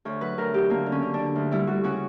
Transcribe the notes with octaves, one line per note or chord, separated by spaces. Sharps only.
D2 C#5
F#3 B4
D2 A#4
F#3 G4
D3 A#3
D3
C#4
D3
D4
D3
D2
G3 E4
G3 F#4
C#3 F#4